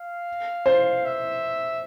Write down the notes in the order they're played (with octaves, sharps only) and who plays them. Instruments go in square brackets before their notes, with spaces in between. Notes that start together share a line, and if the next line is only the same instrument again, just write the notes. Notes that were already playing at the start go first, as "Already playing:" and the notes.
Already playing: [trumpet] F5
[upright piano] C5
[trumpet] E5